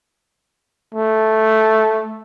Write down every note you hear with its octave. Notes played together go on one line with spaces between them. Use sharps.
A3